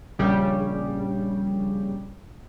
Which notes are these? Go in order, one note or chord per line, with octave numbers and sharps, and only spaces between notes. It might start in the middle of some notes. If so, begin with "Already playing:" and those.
A#1 C#3 G3